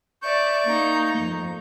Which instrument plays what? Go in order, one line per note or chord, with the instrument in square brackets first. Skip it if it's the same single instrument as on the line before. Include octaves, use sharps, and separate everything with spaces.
[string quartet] D5 E5 [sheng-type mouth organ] C#6 G6
[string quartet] A#3 D#4
F2